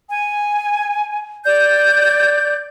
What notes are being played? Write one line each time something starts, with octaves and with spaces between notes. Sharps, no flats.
G#5
D5 G6